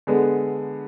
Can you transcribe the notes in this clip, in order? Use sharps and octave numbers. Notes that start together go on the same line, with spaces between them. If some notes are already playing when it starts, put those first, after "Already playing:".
D3 G#3 B3